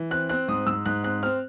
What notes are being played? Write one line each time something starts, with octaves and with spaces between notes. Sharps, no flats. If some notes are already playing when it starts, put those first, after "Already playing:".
Already playing: E3
C4 F#6
C4 F#6
G#2 D#6
G#2 E6
G#2 F#6
C4 F#6
C4 F6